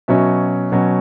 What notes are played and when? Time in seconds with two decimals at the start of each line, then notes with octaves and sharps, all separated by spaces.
0.08 B2 F#3 C#4 E5
0.72 B2 F#3 C#4